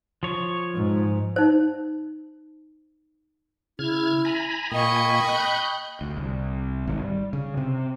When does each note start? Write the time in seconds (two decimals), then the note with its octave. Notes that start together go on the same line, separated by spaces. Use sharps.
0.23 F3 C#5
0.74 G#2
1.36 D#4 C5
3.79 C#3 E4 F6 G#6
4.25 G#5 A#5 B5
4.71 A#2 A#3 D#5 G5 G#5 B5 C#6
5.28 F#6 G6
6.01 D2
6.17 C2
6.87 G#1
7.02 G3
7.33 C#3
7.57 C3